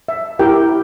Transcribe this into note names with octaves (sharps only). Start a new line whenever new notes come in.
E5
E4 G4 A#4 G5